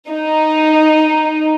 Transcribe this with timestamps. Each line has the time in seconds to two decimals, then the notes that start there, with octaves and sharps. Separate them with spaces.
0.10 D#4